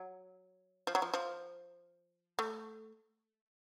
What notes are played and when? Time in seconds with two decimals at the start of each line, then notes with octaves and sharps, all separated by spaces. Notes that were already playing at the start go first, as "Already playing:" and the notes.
Already playing: F#3
0.87 F3
0.95 F#3
1.02 F3
1.14 F3
2.39 A3